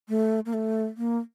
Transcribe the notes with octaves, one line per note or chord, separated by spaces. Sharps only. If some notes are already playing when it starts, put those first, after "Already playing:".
A3
A#3
A3
A#3